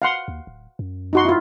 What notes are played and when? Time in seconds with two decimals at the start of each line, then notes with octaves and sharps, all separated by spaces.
0.02 F5 F#5 C6
0.28 D#2
0.47 D1
0.79 F#2
1.13 D#4 F#4 C6
1.25 E4 F4